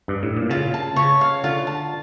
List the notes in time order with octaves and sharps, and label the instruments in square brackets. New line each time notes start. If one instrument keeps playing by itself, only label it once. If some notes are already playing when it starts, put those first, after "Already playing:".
[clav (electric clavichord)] G2
A2
A#2
[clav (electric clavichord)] C#3 [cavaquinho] F4
[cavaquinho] A5
[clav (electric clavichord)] C#3 [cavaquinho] C#5
[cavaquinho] F5
[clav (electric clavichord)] D3 [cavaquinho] F4
[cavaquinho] A5